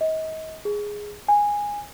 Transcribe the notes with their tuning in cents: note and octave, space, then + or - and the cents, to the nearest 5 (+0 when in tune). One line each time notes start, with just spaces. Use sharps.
D#5 +35
G#4 -5
G#5 -10